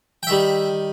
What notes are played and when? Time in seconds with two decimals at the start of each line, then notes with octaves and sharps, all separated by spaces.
0.23 G5
0.27 D#3 G3 E5